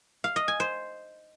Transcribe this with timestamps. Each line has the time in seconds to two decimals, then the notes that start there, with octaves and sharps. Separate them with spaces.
0.24 F5
0.36 D#5
0.48 G#5
0.60 C5